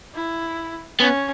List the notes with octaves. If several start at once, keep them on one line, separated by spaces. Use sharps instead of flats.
E4
B3 C#4